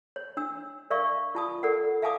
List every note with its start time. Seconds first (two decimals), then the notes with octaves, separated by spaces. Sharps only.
0.16 C#5
0.37 D4 E6
0.90 A#4 D5 E5 F5 C#6
1.35 F4 A5 D#6
1.63 A4 A#4 D5 F#5
2.02 E5 F5 G#5 A5 D6 D#6